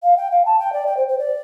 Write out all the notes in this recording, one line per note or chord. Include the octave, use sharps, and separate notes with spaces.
F5
G5
F5
A5
G5
D5
G5
C5
C5
D5